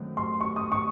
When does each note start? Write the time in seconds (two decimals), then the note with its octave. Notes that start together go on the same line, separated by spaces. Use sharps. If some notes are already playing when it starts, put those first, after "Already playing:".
Already playing: F#2 D#3 F#3 A3 C4
0.17 C6
0.41 C#6
0.56 D#6
0.72 C#6